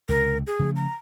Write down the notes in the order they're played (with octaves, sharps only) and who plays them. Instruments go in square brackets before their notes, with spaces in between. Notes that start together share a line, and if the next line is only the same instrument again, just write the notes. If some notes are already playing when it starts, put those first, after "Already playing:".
[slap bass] C#2 C3 [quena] A#4
[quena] G#4
[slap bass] C#3 F3 A3
[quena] A#5